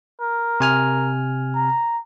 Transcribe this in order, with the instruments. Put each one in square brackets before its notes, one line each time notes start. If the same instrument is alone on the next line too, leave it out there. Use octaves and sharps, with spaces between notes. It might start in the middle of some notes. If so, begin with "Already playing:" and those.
[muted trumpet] A#4
[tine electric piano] C3 G#5 F6
[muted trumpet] A#5